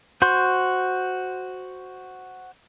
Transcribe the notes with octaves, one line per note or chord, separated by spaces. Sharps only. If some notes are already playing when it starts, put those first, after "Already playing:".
F#4 C5 C6 G6